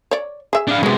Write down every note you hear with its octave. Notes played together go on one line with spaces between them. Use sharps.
C#5 D5
G#4 E5
D4 F5
C3 G#3 B3 F#4